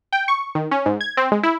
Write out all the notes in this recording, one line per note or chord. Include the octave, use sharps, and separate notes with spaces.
G5
C#6
D#3
C#4
G#2
G#6
C4
G#3
E4